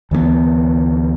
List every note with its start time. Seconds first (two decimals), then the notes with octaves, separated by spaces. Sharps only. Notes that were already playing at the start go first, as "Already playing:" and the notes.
0.11 D2 E3 G#3 B3